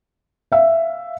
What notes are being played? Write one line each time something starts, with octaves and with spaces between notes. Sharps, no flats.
E5 F5